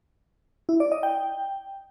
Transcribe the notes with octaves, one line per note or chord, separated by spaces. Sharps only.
E4
D5
D#5
G5